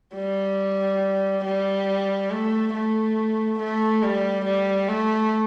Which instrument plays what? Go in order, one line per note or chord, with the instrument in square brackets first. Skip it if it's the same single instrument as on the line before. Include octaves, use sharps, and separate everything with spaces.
[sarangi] G3
G3
A3
A3
A3
G3
G3
A3